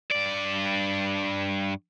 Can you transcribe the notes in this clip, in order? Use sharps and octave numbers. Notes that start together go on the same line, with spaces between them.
G2 D5